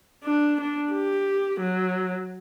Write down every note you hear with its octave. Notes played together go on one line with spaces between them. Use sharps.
D4
D4
G4
F#3